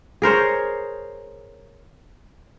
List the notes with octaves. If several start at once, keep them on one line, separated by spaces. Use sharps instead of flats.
G#4 A#4 C5 C#5